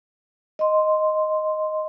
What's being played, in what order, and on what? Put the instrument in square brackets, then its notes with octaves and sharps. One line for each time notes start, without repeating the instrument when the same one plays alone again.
[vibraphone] D#5 C6